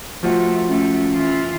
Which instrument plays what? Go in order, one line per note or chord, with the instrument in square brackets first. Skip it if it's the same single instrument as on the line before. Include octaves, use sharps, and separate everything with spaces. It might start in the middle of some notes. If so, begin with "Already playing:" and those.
[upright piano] F3 F4 F#4 [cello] A3
[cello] A3 [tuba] C#4
[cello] E3 F4